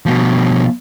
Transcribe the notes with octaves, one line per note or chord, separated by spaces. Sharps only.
B2 F3